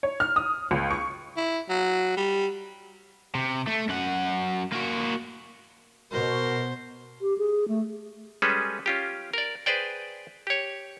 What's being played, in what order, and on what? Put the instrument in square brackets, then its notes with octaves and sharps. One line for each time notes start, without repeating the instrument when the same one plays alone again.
[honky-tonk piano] C#5
F6
D#6
C#2
C#6
[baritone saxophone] E4
F#3
G3
[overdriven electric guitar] C3
A3
F#2 F#5
A#3 F#4
[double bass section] B2 [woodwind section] F#4 A#4 [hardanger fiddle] C5
[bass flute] G4
G#4
A3
[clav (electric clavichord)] G3 G#3 C#4 G#4 A4 B4
C#4 F4 G4
A#4 D5
G#4 B4 C5 D5 G5
G4 C#5